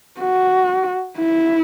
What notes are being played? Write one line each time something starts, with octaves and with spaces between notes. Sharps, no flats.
F#4
E4